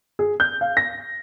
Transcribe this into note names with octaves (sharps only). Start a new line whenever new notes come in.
G#4
G6
F5
A#6